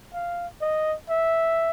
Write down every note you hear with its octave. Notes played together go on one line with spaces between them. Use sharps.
F5
D#5
E5